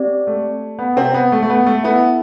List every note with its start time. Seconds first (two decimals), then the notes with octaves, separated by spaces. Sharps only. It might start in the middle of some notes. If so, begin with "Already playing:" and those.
Already playing: C4 G4 D5
0.27 A3
0.79 B3
0.96 C3 C4
1.14 B3
1.32 A3
1.43 A3
1.50 B3
1.66 A3
1.84 B3 E4 A4 E5